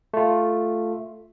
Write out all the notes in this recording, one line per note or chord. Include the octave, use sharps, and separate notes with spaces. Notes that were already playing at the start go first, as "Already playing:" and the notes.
A3 F4